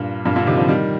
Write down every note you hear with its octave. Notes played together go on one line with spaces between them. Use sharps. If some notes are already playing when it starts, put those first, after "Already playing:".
Already playing: G2 A#2
G2 A#2
A#2 D3
C3 D#3
D3 F3
D#3 G3